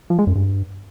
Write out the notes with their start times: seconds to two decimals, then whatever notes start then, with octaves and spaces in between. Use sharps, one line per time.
0.10 F3
0.19 G#3
0.27 F#2
0.36 G2